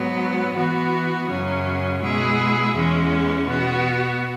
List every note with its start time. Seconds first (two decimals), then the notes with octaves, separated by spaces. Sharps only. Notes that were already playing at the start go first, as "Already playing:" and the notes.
Already playing: G#2 F#3 B3
0.54 E3 B3 F#4
1.27 F#2 C#3 F#3 C#4
2.01 B2 G#3 E4 G#4
2.74 E2 E3 G#3 C#4
3.47 B2 B3 F#4